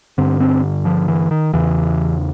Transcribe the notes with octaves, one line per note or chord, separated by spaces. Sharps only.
G2 D3 C4
C4
F3
E3
D#3
E2 C#3 E3